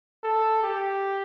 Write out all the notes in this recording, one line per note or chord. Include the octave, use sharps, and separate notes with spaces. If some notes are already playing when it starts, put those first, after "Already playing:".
A4
G4